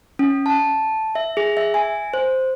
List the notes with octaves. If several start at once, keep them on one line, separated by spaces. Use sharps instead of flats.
C#4
A5
E5
G#4
E5
G#5
C5